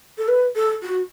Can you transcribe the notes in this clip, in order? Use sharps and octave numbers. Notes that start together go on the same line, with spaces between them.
A4
B4
A4
F#4